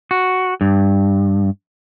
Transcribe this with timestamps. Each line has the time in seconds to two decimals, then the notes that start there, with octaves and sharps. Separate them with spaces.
0.11 F#4
0.61 G2